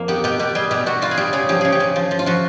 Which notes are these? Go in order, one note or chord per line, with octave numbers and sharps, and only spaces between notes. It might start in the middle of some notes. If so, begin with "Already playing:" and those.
Already playing: F2 A#3
B3 G4
B2 G4
B2 G4
G3 G#4
B2 G4
B2 F#4
G3 F4
G#4
G3 G4
C#3 G#4
F3 G4
C#3 G#4
G4
C#3
F3
F3
F4
F3 F#4